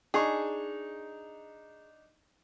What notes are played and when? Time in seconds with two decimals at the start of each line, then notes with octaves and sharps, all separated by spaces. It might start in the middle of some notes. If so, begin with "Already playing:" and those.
0.14 D4 D#4 G#4 C#6